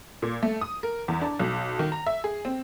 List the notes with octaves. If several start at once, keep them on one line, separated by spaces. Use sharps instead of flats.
A#2
A3
D#6
A#4
E2
D4
B1
D#3
A#5
E5
G#4
C4